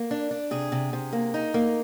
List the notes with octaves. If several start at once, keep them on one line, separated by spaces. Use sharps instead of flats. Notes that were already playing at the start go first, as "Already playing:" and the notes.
Already playing: A#3
D4
D4
C3 G#4
C3
C3
A#3
D#4
A#3